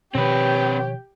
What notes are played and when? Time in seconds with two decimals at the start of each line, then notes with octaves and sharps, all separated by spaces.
0.15 B2 D#3 F3 C4 G4 B4 C#5